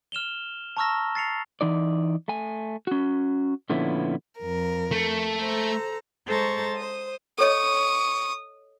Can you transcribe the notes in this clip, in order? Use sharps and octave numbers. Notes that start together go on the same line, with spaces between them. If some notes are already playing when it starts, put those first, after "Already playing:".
F6 E7 F7 G7
A5 A#5 C#6 E6 F6 A#6
A6 C7 C#7 F7
E3 D#4 D5
A3 G#5
C#4 F#4
A#2 D3 F3 B3 C#4 E4
F2 A#4
A3
A4 C5 A#5
G#3 A4 C5 A#5 C#6 A6
C5 D#6
A4 C#5 D#5 C#6 D#6